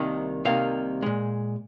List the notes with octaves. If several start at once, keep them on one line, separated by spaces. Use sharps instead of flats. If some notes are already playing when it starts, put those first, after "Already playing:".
Already playing: C2 C3 D#3 A#3 D#5
C2 C3 D#3 A#3 F5
A#2 G#3